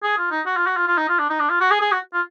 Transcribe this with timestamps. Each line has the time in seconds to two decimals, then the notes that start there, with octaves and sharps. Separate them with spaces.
0.03 G#4
0.18 F4
0.31 D#4
0.46 F#4
0.57 F4
0.67 F#4
0.77 F4
0.88 F4
0.98 D#4
1.09 F4
1.19 D4
1.30 D#4
1.40 D4
1.50 F4
1.61 F#4
1.71 G#4
1.81 G#4
1.92 F#4
2.13 F4